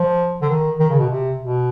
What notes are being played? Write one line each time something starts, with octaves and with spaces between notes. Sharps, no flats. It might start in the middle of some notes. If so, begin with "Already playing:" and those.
Already playing: F3
D3
D#3
D#3
C#3
B2
C3
B2